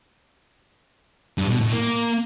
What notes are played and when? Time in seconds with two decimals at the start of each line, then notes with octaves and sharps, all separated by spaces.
1.38 G2
1.49 B2
1.60 A2
1.72 A#3